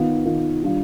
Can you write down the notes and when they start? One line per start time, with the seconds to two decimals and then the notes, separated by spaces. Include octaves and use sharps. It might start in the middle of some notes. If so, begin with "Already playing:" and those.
Already playing: D#3 B3 F4
0.26 D#3 B3 F4
0.62 D#3 G3 D4 F4